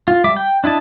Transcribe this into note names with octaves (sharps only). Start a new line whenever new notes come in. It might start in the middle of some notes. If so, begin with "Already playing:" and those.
F4
G3 E5 D6
G5
D4 E4 D#5 A5